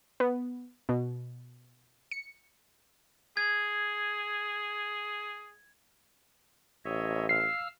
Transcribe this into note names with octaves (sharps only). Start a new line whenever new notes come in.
B3
B2
C#7
G#4 G#6
A1 C#5 D#5 E5
F5 E6 F6 C7